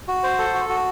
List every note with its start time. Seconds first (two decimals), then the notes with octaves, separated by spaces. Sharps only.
0.08 F#4
0.23 C5
0.39 A4
0.54 F#4
0.69 F#4